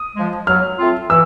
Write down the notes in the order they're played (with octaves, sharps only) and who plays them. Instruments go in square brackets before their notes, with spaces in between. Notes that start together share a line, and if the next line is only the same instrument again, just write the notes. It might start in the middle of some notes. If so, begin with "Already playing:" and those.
Already playing: [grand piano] D#6
[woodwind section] F3 G#3
[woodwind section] F#3 [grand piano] F6
[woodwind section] A3 C4 F4
[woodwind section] E3 [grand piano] E6